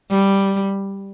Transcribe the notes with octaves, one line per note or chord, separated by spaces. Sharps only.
G3